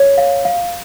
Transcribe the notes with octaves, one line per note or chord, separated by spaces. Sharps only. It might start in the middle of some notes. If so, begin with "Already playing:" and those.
Already playing: C#5
F5
F5